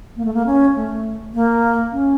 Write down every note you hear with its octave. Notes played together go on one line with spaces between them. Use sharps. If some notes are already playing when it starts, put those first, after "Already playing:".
A#3
A3
A#3
C#4
A3
A#3
C#4